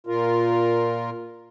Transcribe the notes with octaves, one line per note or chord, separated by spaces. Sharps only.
A#2 F4 A#4